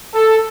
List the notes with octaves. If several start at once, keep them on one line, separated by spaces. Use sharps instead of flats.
A4